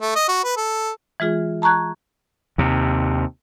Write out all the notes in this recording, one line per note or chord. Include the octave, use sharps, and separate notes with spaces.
A3
D#5
F#4
B4
A4
E3 G#3 F4 G#4
A5 A#5 C#6 F#6 G#6
D#2 C3